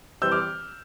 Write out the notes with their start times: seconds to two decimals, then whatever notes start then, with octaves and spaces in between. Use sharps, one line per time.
0.22 C3 E3 G3 C4 E6 G6
0.32 D6 F6